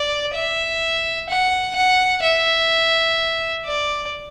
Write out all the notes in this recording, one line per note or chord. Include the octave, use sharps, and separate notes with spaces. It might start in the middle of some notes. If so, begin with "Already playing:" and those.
Already playing: D5
E5
F#5
F#5
E5
D5